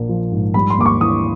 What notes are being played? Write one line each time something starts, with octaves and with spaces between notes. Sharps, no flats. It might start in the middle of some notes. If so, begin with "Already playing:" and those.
Already playing: A#1 A#3
F3
G#2
G3 B5
C6
D#2 D6
C#6
E3 D#6